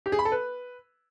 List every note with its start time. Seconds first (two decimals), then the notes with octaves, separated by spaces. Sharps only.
0.06 G4
0.12 G#4
0.19 B5
0.25 A4
0.32 B4